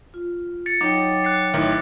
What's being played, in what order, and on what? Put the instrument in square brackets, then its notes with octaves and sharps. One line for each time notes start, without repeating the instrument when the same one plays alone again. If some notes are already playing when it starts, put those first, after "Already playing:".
[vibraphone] F4
[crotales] A6 C#7
[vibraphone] F#3 C#5 G5 [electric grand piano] D#4 [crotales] D6 C#7
[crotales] F#6 A6 C7
[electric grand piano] A1 D#3 E4